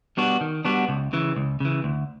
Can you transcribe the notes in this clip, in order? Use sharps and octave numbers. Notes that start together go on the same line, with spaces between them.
G3 B3 D4 F#4
D#3
G3 B3 D4 F#4
C#2
C#3 E3
C#2
C#3 E3
D2